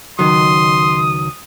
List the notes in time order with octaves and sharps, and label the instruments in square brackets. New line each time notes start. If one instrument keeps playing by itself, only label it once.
[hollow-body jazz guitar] C#2 D#3 F#3 [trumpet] C6 [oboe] D#6